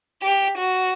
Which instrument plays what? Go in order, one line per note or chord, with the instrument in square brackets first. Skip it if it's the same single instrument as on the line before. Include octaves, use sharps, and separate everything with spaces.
[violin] G4
F#4